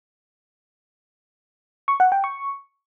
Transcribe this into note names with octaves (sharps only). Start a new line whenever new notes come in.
C#6
F#5
G5
C#6